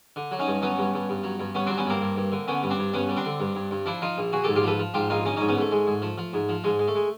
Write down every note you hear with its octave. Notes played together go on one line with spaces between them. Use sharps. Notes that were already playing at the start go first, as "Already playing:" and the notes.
D3
F#3
C#4 D#4
G2
F#3 B3 C#4
G2
G2
G2
F#3
G2
G2 B3 C#4
F#3 C4 D4
B3 C#4
G2 A#3 C4
G2
G2
D3
D3 B3 C#4
G2
C4 D4
G2
G2 B3 C#4
G3
C4 D4
D3
G2
G2
G2
F3 D4 E4
F3 D#4 F4
A#1
A#1 F#4 G#4
G#2 G4 A4
F4 G4
F3 A4 B4
F3
G#2 F4 G4
A#1 D#4 F4
A#1 C#4 D#4
G#2 C#4 D#4
B3 C#4
G#2 A3
G#3
G#2
F3
F3
G#2
F3
G#2 G#3
G#3
A3
G#3